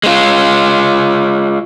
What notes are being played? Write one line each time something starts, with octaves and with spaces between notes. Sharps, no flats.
G#3 F4